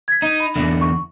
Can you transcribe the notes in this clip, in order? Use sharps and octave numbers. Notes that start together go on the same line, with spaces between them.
G#6 B6
D#4
B5
E2 D3
C#6